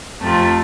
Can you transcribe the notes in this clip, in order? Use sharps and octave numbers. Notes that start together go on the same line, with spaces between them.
F2 C3 F3 A3